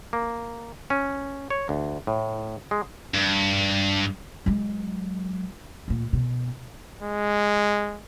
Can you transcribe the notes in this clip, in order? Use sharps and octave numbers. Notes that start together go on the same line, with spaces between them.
A#3
C#4
C#5
D2
A2
G#3
G2
F#3 G#3
D2 A#2
B2
G#3